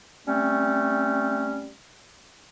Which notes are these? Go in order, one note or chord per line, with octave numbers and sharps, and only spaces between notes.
G3 A3 C4 C#4